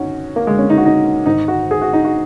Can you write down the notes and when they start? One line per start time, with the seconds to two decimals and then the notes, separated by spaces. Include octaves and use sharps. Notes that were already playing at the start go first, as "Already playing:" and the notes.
Already playing: F#2 C#4 D#4 F#4
0.36 A#3
0.47 G#3
0.58 C#4
0.70 D#4
0.78 F#4
0.85 D#4
1.26 G#2 D#3 D#4
1.48 F#4
1.71 G#4
1.82 F#4
1.93 D#4
2.04 F#4